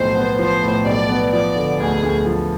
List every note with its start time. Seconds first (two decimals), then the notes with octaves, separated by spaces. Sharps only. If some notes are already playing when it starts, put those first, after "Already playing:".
Already playing: B1 A2 F3 C5
0.16 B3
0.39 F3 C5
0.63 A2
0.86 B1 D5
1.09 B3
1.33 F3 D5
1.56 D3
1.79 D2 G#4
2.03 D2
2.26 F3